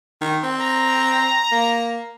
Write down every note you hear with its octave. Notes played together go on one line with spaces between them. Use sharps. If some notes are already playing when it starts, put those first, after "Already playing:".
D#3
C4
A#5
A#3